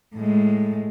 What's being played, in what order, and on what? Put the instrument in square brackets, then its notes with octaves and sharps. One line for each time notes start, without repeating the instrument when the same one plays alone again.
[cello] A2 G#3